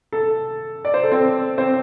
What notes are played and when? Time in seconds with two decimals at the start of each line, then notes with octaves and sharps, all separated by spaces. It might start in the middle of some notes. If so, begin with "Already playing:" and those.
0.13 A4
0.85 D5
0.94 C5
1.04 A4
1.12 C4 C5
1.58 C4 C5